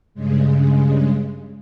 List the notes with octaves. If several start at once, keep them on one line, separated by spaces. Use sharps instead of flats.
G2 C#3 G#3